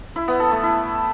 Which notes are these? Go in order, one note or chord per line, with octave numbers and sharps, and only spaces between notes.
E4
B3
A4
A3
E4